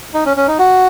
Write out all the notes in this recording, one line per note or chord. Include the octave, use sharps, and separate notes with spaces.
D#4
C#4
C#4
D#4
F#4